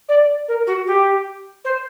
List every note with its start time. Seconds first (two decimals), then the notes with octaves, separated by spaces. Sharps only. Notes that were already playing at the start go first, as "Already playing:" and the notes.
0.08 D5
0.48 A#4
0.67 F#4
0.87 G4
1.64 C5